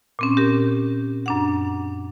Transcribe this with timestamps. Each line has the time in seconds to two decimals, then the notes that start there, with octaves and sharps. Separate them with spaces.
0.19 A#2 C4 C#4
0.37 G4 A#4
1.26 F#2 D4 F#5